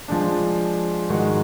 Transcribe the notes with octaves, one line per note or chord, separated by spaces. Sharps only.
F3 G#3 D4
G#2 D#3 G#3 D#4 F#4